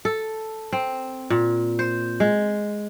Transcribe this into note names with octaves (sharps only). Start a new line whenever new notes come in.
A4
C4
A#2
C5
G#3